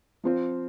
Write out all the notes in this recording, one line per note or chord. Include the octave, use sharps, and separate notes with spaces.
F3 C4 F4 C5